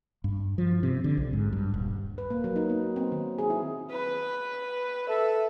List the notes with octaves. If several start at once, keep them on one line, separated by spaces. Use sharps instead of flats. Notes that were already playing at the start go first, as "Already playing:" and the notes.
G2
F3
C3
D3
B1
G#2
G2
D#1
B4
A#3
F#3
D#4
B3
C4
D#3
G#4
E4
B4
A4 E5